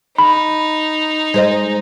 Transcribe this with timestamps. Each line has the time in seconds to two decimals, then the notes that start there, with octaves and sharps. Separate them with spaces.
0.18 D#4 B5
1.34 G#3 C5 D#5